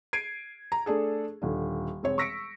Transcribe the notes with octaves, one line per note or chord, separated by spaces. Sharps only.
G#6 C7 D7 D#7
A#5
A3 D4 G#4 A4
D#1 D3
E1 C4 C#5
C#6 E6 A#6 B6 C#7 D7